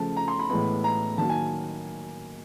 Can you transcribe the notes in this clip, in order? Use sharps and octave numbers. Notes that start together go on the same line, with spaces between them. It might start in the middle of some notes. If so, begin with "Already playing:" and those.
Already playing: C#3 F3 A3 A5
A#5
C6
B5
A2 E3 G#3 B3 B5
A#5
D#3 F#3 A#3 A5
G#5